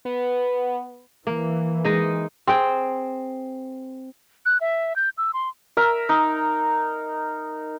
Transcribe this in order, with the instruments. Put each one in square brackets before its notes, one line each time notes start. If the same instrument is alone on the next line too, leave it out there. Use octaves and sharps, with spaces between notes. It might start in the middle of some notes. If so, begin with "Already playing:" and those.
[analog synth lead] B3
[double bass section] E3 [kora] A#3
[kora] G#3 D#4 D#5
C4 G#4 G5
[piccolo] F#6
E5
G6
E6
C6
[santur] A#4 E5
D#4